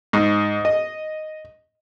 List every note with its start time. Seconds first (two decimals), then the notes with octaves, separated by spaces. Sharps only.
0.13 G#2
0.65 D#5